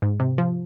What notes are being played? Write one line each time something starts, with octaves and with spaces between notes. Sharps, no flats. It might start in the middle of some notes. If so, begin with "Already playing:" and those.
G#2
C3
F3